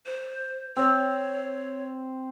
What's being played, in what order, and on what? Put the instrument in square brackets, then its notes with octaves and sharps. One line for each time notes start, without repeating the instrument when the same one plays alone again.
[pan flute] C5
[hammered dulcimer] C4 [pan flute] C#5